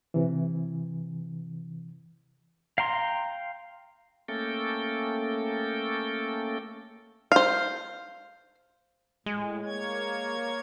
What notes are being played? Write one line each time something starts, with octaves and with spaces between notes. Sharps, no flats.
C3 E3
F5 G5 A#5 C6
A3 A#3 C#4 A4 G5
C5 F5
A2 G#3
A#3 C#5 G#6